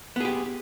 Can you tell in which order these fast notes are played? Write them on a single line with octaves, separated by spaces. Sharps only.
B3 G#4 G4